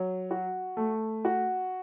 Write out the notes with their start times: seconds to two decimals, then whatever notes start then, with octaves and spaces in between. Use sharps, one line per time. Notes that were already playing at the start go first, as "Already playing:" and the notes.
Already playing: F#3
0.31 F#4
0.77 A3
1.25 F#4